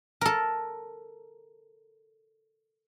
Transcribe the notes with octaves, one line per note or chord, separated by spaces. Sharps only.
A4 A#4